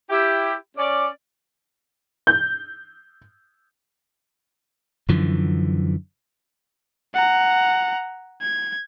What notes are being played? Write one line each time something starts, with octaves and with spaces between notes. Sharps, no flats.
E4 G4
C#4 D5
G6
F#2 D3 E3 F3
F#5 A#5
G#6